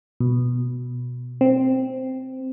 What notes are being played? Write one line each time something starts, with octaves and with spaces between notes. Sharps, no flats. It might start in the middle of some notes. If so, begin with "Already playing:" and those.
B2
C4